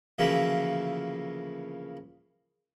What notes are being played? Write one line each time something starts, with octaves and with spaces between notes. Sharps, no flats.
D2 C#3 E3 F3 A#3 E5